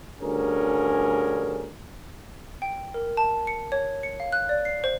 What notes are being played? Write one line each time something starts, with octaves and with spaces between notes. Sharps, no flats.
D2 G2 C#4 G#4 A#4
G5
A#4
A5
C#7
C#5
C#7
F5
F#6
D5
C7
C5